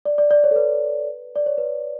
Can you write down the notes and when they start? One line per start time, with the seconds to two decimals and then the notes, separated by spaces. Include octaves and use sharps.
0.05 D5
0.18 D5
0.31 D5
0.44 C#5
0.51 A4
0.56 B4
1.36 D5
1.46 C#5
1.58 B4